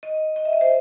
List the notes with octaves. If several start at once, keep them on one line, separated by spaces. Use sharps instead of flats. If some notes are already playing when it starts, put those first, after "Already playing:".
D#5
D#5
E5
D#5
C5